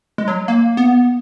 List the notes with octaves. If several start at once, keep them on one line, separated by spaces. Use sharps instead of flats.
G#3
F#3
A#3
B3